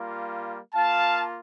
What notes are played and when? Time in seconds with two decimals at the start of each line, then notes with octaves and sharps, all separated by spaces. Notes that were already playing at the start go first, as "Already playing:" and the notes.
Already playing: G3 A#3 F4
0.75 A#3 F4 F5 A5